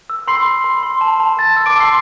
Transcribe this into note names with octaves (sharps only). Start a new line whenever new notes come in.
E6
B5 C6 C7
B5
B5
C6
A5
A5
A5 A6
E6
D6 D7
A5 C6 C7